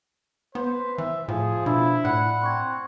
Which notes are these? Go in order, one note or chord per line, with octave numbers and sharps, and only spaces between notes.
B3 B4 C5
E3 E5
A2 F3 G#4
B2 D4 E4 B5 E6
A2 D5 F#5 B5
C4 C6 C#6 G#6